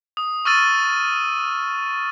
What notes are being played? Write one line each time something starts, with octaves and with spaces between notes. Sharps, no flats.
D#6
C#6 E6 F6 A6 D#7